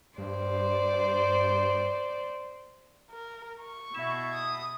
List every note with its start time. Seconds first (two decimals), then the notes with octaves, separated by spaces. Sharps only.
0.18 G2 C5 D5
3.10 A#4
3.61 C#6
3.95 B2 E4 E5 E7
4.34 D#6